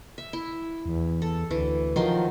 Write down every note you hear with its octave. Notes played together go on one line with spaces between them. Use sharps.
E5
E4
E2
A4
D2 E3
D#3 F3 F#3 C6